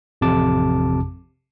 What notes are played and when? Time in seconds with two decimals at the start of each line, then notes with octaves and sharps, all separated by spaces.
0.21 A1 F2 C3 A5 D6